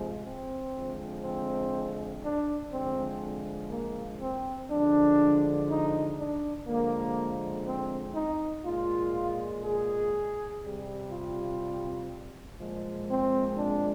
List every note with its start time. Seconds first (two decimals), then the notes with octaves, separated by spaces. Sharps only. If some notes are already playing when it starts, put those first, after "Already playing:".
Already playing: C3 F3 G#3
0.25 C4
0.74 D3 F3 G#3
1.23 C4
2.22 D4
2.71 D3 F3 G#3 C4
3.70 A#3
4.19 C4
4.68 D3 F3 G#3 D4
5.68 D#4
6.17 D4
6.66 D3 F3 G#3 A#3
7.65 C4
8.14 D#4
8.63 A#2 G#3 F4
9.63 G#4
10.61 C3 G3
11.11 F4
12.59 A#2 F3 G#3
13.09 C4
13.58 D4